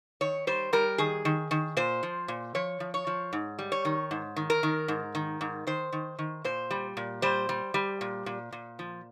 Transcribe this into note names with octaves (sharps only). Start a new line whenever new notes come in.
D#3 C#5
G3 C5
G3 A#4
D#3 G#4
D#3
D#3
A#2 C5
F3
A#2
F3 C#5
F3
C#5
F3
G#2
G3
C#5
D#3
G#2
D#3
A#4
D#3
G#2
D#3
G#2
D#3 C5
D#3
D#3
A#2 C5
G3
A#2
G3 C5
G3
G3
A#2
A#2
A#2
F3